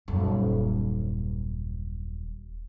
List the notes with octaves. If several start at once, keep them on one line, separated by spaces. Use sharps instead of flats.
D#1 F#2